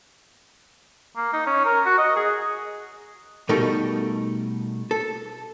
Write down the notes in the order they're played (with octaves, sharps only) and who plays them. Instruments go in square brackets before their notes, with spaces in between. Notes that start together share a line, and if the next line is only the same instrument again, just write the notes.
[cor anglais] A#3
D#4
C#4
A#4
F#4
D#5
G#4
[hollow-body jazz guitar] B2 G3 A3 D#4 A4 A#4
A4